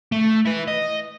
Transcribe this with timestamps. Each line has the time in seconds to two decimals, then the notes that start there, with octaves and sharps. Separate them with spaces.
0.12 A3
0.45 E4 B4
0.67 D#5